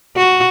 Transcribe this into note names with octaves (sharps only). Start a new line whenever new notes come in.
F#4